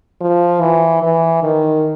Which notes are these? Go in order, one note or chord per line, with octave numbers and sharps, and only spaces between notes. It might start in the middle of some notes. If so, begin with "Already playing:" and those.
F3
E3
E3
D#3